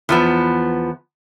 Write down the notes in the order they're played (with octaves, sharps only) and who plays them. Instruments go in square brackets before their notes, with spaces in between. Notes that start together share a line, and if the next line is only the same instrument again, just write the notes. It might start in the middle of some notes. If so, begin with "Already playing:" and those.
[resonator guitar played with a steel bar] E2 F3 B3